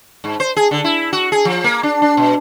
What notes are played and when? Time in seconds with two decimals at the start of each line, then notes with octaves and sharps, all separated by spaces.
0.24 G#2
0.40 C5
0.56 G#4
0.71 D3
0.84 E4
1.13 F#4
1.32 G#4
1.45 F3
1.64 A#3
1.83 D4
2.02 D4
2.17 B2